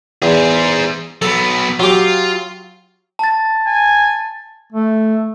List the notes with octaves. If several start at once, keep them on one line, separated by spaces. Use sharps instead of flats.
E2 G#4 C5
F#3 B3 A4
F#3 F4 G4
A5 A6
G#5
A3